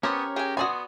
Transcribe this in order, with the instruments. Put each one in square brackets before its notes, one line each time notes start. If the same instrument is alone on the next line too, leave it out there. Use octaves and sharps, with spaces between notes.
[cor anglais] B3 [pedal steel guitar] C#4 A#4 C#5 [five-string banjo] G4 C5
[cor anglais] G4 [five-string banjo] G#4 G#5
[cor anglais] B3 [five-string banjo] F#4 D5 G#5 [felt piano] C6 D#6